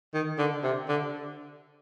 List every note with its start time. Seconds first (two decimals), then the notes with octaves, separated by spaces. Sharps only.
0.14 D#3
0.38 D3
0.63 C3
0.88 D3